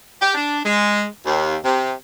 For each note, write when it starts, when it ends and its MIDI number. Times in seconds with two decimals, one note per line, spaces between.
0.20 0.34 67
0.35 0.58 62
0.65 1.03 56
1.26 1.56 39
1.64 1.91 48